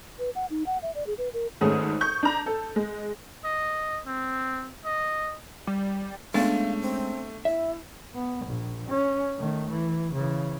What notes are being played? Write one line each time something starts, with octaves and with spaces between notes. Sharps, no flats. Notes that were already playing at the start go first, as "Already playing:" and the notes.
B4
F#5
D#4
F#5
E5
D5
G#4
B4
A#4
G#1 G#2 A3 C#4 G#4 D#6
C#6 G6
D4 A#5
A4
G#3
D#5
C4
D#5
G3
G#3 A3 B3 C#4 D4 F5
C4
E4 E5
B3
A#1
C#4
D#3 A3
E3
C#3 E3